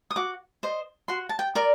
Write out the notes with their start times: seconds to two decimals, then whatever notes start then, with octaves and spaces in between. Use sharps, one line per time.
0.11 D#6
0.16 F#4 D6
0.63 C5 D#5
1.08 F#4 C6
1.29 A5
1.39 G5
1.55 A#4 D5